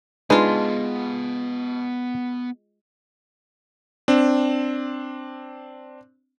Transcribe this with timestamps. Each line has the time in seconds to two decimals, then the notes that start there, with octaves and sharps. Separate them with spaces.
0.30 G#3 B3 D4 D#4 F4 B4 A5
4.08 C4 D4